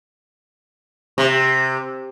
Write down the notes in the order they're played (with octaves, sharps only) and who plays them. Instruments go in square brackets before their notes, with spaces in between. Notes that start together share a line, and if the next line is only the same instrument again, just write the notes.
[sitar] C3